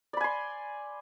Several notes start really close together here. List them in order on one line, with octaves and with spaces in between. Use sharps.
D5 B5 G#5 C6